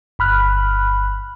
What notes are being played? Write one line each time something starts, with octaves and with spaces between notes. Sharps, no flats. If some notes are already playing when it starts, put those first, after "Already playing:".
G1 B5 F6 F#6